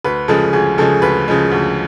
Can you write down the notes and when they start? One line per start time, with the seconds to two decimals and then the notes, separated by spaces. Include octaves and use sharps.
0.04 D2 B4
0.28 C#3 F3 G#3 A4
0.53 D2 G#4
0.78 C#3 F3 G#3 A4
1.02 D2 B4
1.28 C#3 F3 G#3
1.51 D2